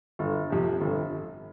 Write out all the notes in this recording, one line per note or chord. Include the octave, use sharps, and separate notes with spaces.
G1
F2 C3
G1